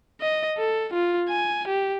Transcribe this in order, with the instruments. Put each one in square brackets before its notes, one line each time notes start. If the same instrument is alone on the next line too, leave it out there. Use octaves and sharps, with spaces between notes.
[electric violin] D#5
A4
F4
G#5
G4